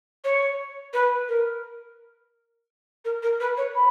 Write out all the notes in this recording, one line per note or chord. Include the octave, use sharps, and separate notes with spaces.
C#5
B4
A#4
A#4
A#4
B4
C#5
B5